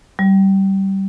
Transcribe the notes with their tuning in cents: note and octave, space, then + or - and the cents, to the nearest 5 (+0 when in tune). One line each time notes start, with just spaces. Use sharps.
G3 -20